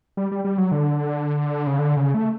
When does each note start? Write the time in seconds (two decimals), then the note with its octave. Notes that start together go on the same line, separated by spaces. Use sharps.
0.17 G3
0.32 G3
0.45 G3
0.58 F#3
0.72 D3
1.67 C#3
1.79 D3
1.97 C#3
2.14 A3